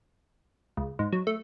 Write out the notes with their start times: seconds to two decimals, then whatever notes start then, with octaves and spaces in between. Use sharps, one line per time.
0.77 C#2
0.99 G#2
1.12 F#3
1.27 A3